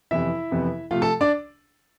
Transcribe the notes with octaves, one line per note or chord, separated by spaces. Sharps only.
F2 C3 E3 B3 E4 E5
F2 C3 E3 B3
C3 F3 A3 F4 F5
A4 A5
D4 D5